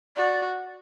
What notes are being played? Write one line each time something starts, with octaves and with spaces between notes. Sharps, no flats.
F#4 D5